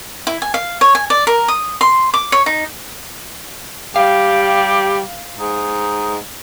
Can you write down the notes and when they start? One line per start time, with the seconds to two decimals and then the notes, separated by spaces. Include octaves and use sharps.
0.27 E4
0.42 G#5
0.54 F5
0.81 C#5
0.95 G#5
1.10 D5
1.27 A#4
1.48 D#6
1.81 C6
2.14 D6
2.32 C#5
2.46 D#4
3.96 G3 G4 F5
5.39 G#2 D#4